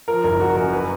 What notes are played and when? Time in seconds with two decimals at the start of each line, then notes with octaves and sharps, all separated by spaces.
0.08 F3 A#4
0.24 F#1 A#4
0.40 F#1 F#4
0.56 F#2 A#4
0.73 F#3 B4